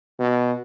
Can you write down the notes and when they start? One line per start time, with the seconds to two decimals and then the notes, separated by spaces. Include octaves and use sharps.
0.19 B2